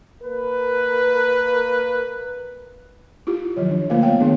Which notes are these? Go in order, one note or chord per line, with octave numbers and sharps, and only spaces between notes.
A#3 A#4 B4
E4 F4 G4
D#3 F3 F#3 C#5
D4
D3 A3 A#3 F4 A#4 F5
B3 C#5 F5 G5
D#3 A3 B3 D4 G#4